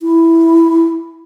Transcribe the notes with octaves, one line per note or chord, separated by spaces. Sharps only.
E4